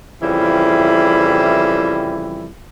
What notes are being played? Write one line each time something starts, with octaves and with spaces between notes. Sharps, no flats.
F2 C#3 E3 G3 E4